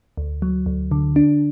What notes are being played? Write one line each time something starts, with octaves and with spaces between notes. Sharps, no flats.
D2
F#3
D2
D3
D4